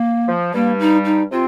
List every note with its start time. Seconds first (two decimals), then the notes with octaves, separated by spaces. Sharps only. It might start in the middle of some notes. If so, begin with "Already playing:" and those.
Already playing: A#3
0.27 F3
0.53 G2 G3 A#3
0.79 D#4
1.05 D#4
1.31 C3 C4 F4